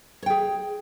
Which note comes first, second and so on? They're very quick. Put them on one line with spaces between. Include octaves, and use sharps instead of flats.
C#5 G5 G#4